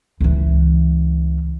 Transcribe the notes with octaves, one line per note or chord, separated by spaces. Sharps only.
C#2 E3